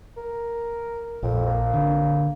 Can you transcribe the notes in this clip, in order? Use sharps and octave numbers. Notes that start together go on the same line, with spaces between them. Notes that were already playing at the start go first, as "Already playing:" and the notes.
A#4
A#1 F2
A#3
D3